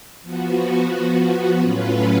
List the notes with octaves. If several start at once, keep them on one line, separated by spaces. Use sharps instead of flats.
F3 B3 F#4
A2 F#3 C#4 F4 B4